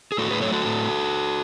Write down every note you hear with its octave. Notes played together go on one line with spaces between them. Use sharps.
G#4
A2 F#4 A4
G#4 B4
F#3 A3 A4 C#5
F#4 A4
A2